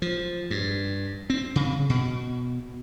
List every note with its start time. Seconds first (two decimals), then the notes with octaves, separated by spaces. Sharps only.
0.02 F3
0.50 G2
1.30 C4
1.56 C#3
1.90 B2